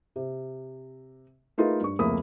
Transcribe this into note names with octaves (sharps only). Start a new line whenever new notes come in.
C3
A3 D#4 F4 G#4 A#4 B4
G2 C#6
F1 C#2 A3 A#3 B5 D#6